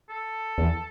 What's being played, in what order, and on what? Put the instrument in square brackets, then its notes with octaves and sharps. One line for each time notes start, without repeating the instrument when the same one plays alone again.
[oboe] A4
[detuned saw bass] E2